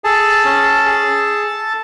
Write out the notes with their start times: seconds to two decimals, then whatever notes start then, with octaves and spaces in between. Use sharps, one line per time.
0.04 G#4 A4 A5
0.45 C#4
0.85 G#4